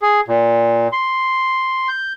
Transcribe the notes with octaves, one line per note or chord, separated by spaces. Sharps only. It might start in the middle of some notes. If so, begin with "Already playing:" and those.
G#4
A#2
C6
G6